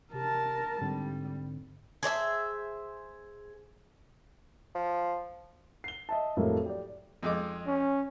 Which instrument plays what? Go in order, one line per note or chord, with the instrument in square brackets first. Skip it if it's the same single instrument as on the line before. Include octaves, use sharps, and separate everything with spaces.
[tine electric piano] C3 G4 [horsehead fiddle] A#4 A5
[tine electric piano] G#2 D3 C4 [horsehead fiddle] G3
[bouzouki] G#4 C5 D5 E5
[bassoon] F3
[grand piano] C7 G7
D#5 E5 A5
F2 A2 F#3 G3 A3 A#3
G4 D5
[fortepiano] F2 G#3 D6
[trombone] C#4